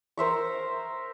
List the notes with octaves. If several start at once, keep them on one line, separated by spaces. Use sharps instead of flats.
A#4 C5 E5 C#6